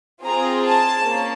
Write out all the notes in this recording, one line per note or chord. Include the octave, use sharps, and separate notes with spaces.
C4 F4 G#4 A#5
A5
A#3 C#4